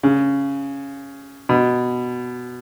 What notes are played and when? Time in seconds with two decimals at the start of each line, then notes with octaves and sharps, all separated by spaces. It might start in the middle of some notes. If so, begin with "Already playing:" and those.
0.03 C#3
1.49 B2